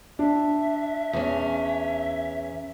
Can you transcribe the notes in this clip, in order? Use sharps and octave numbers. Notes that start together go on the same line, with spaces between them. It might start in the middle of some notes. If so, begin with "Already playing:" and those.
D4 E5
E2 C#4